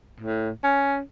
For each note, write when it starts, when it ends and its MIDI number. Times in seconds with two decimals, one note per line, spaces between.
0.20 0.50 45
0.64 0.99 61